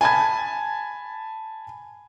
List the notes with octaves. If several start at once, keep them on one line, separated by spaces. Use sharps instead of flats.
G#5 A5 B5 G#6